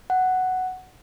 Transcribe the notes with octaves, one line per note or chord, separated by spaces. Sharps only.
F#5